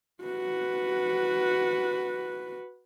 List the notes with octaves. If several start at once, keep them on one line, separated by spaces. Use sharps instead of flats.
F#4 B4